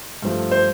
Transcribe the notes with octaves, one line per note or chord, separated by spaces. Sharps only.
G2 F3 A3
C5